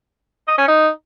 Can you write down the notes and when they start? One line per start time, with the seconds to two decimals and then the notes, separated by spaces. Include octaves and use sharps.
0.48 D#5
0.58 C#4
0.68 D#4